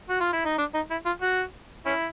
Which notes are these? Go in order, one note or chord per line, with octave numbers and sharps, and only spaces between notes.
F#4
F4
E4
D#4
D4
D#4
E4
F4
F#4
C#4 E4